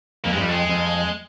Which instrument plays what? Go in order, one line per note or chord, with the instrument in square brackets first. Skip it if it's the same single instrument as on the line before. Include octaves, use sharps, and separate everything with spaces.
[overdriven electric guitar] F2 [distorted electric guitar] A#3
[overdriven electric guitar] G2 [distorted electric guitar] G#3
[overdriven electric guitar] F2 [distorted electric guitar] G3
[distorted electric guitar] G#3
[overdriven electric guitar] F2